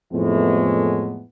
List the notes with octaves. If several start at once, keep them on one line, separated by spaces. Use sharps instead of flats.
F2 A2 E3 G#3 A3 B3